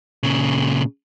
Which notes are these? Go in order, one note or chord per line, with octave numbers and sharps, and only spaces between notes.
A#2 C#3